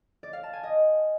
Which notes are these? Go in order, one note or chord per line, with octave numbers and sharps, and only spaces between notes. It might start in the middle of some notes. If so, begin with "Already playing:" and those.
D5
F5
A5
G#5
D#5